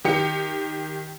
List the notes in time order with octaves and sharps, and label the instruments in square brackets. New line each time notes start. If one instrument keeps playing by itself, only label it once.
[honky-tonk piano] D#3 G4 C#7